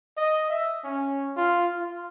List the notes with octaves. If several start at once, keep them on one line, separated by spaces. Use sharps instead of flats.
D#5
E5
C#4
F4
F4